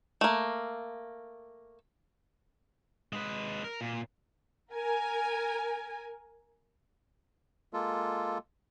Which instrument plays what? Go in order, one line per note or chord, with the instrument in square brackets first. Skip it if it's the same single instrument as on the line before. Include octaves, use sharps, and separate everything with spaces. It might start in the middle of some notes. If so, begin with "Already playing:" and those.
[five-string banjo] A3 A#3
[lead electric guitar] G#3 B4
A#4
A#2
[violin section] A#4 G#5
[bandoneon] G#3 A#3 F4 A4